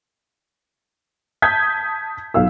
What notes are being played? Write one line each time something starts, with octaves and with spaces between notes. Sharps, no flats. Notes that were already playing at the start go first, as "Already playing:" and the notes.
A5 D#6 G6 G#6 B6
B1 F5 E6